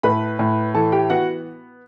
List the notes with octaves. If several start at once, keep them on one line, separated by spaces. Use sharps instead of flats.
A2 B4 B5
A2
E3 A4 A5
G4 G5
B3 F#4 F#5